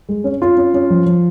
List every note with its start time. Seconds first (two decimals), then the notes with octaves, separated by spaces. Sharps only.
0.09 G#3
0.24 C#4
0.41 C#4 F4
0.57 C#4
0.74 C#4
0.90 F3
1.06 F3